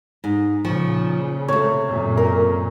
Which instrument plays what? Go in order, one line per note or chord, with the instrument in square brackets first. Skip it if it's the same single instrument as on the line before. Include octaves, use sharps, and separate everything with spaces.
[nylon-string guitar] G#2
[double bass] A#2 C#3 [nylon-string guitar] F3 [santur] C#6
[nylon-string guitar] C3 A3 [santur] C#5
[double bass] F#2 A#2
[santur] A#4